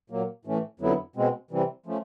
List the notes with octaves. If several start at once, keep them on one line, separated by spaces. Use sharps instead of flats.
A#2 F#3 A#3
A2 E3 A3 C#4
F2 D3 F#3 B3 E4
B2 G#3 C4
C3 E3 G3 C4
F3 A3 C#4